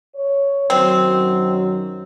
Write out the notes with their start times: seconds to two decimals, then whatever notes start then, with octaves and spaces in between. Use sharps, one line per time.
0.15 C#5
0.70 F#2 D#3 F#3 C4